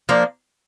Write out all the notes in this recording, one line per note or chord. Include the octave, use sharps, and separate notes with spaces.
F3 A#3 D4